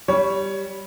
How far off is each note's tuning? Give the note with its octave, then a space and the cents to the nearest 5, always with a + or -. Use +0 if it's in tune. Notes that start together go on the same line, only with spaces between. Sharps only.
G3 +0 C#5 +15